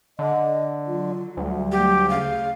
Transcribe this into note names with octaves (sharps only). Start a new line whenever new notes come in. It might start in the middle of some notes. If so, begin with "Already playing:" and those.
D3 D#5
F#3 F4
D2 G3
F#3 A3 G4
C#3 G#4 F5